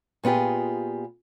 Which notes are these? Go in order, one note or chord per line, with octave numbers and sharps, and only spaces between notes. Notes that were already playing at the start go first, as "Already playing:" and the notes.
A#2 B3 F4 G4 G#4